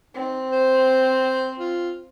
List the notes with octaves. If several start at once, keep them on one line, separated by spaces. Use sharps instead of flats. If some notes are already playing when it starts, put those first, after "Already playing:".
C4 D#4
C5
F4